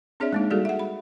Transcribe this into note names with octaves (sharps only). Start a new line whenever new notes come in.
C4 D4 G#4 C#5 D5 E5
G#3 A#3 D#4
G3 A#3 F#4 G#4 A4 D5
E5 F#5
B5